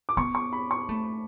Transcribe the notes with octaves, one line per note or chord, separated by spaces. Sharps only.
D6
B3 C#6
C#6
B5
C#6
A3